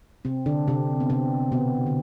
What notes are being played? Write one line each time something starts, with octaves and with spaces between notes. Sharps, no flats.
C3 C4
D3 D4
C3 C4
B3
C3 C4
B2 B3
D3